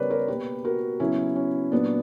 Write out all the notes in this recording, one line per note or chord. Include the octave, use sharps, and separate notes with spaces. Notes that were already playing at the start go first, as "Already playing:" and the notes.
Already playing: C#3 G3 B3 A#4 B4 C#5 D5
A#4 C#5
B2 A#3 G4 B4
F#4 A#4
C#3 F#3 B3 C#4 E4
C#4
A#2 F#3 A#3 B3 D4